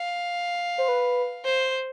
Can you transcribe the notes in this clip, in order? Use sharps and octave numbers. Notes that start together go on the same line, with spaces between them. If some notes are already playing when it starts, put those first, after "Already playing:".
Already playing: F5
C5
B4
C5